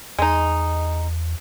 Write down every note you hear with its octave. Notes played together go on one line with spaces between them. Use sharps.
E2 G#3 D#4